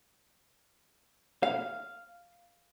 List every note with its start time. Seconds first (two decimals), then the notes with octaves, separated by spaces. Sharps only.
1.43 F5